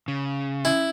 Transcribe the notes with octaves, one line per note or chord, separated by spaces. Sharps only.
C#3
C#4 E4